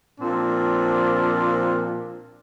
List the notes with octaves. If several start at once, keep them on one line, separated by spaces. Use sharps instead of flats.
A#2 F3 C4 D4 F4